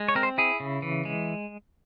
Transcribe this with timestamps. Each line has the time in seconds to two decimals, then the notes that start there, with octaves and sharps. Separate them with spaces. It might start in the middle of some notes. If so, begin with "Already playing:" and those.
Already playing: G#3
0.09 C#5
0.15 C4 A#4
0.23 C5
0.38 E4 G#4
0.60 C#3
0.82 E3
1.05 G#3